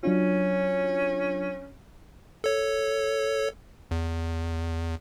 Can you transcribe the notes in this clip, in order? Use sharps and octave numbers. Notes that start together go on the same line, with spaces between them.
F#3 C#4 D4 F4
A4 C#5
E2